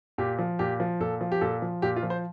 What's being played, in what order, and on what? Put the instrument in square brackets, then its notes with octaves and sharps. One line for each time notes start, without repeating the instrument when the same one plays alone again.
[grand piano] A#2 G4
F3
A#2 G4
F3
A#2 A4
F3
G4
A#2 A4
F3
A#2 G4
F4
F3
C5